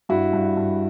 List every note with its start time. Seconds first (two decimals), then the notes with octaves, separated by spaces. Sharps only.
0.09 G2 E4 F#4
0.33 G2
0.57 G2